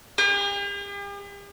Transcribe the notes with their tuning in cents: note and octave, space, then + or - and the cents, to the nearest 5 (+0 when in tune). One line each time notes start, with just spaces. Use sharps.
G4 +45